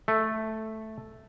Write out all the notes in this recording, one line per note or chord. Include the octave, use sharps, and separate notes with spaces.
A3